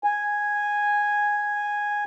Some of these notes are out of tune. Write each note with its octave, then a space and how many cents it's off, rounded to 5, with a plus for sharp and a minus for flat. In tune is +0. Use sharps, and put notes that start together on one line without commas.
G#5 -5